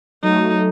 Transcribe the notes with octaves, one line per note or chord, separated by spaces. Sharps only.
F#3 A3 D#4